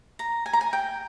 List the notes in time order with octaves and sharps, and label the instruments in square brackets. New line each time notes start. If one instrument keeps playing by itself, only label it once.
[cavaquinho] A#5
G#5
A#5
G#5
G5